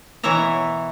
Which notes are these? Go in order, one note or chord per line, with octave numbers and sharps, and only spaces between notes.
B2 E3 C#5 E5 A#5